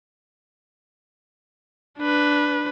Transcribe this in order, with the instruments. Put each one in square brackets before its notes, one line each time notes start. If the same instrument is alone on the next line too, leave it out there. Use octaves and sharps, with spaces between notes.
[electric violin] D4 B4